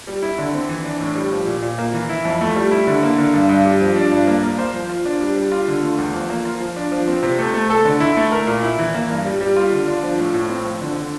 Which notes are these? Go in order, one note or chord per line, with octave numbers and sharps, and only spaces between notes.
G3
E4
D3
C4
E3
D4
A2
G3
F3
A#2
A#2
A#3
E3
E4
F2
A3
G3
E4
D3
A#3
D3
G2
G2
G3
F3
D4
G2
A#3
A#3
C5
F3
F4
D4
G3
G3
F4
D3
A3
E2
F3
A#3
F4
F3
D4
F3
C4
C3
A3
A3
A4
D3
E4
A3
A#4
A#2
E4
E3
A#3
G2
G3
G3
F4
D3
D4
F3
A2
A2
C4
F3
D3
D3